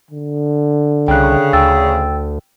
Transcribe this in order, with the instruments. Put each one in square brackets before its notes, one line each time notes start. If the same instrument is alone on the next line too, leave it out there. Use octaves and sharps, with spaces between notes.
[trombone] D3
[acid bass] C2 [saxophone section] C#3 [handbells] G5 F#6
[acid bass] D2 [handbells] G5 E6 A6